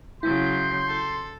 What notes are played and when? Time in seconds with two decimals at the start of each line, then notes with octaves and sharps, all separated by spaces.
0.23 C#3 F#3 E4 C6 G6
0.87 A4